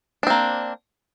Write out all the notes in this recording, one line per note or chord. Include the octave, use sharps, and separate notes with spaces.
A#3 C4 D4